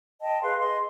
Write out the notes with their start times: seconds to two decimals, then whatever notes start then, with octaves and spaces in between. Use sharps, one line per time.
0.21 D#5 G5 A5
0.42 G#4 B4 F5 C6
0.59 G#4 D#5 C6